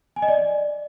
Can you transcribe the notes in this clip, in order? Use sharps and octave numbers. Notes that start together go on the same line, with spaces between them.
G#5
D#5
D5